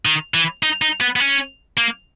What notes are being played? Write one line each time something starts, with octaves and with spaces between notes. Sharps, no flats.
D#3
E3
D#4
D#4
B3
B3
C#4
A#3